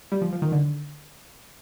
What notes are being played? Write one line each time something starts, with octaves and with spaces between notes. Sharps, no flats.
G3
F3
F3
D#3
D3